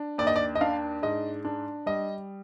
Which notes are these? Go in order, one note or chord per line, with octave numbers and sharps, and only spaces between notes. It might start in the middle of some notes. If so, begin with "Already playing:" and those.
Already playing: D4
D#2 D5
D#5
D5
D#5
D4 F5
G#2 D#5
D4
G3 D#5